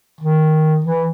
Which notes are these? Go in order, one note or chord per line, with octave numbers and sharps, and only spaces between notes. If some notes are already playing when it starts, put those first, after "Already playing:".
D#3
E3